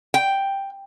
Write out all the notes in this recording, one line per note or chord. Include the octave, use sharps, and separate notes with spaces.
G5